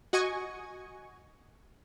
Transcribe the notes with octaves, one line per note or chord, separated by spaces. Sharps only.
F#4 D#5 G#5 C#6